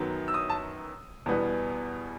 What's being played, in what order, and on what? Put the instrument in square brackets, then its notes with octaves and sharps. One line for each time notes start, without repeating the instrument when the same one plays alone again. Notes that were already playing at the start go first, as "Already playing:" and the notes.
Already playing: [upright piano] F#2 D#3 F#3 B3
E6
D#6
A5
E2 B2 G3 B3